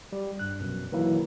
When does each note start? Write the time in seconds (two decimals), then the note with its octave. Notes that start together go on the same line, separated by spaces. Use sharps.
0.12 G3
0.39 G2 F#6
0.60 A#1 F#2 B2
0.92 D#3 E3 F#3 A#3 E4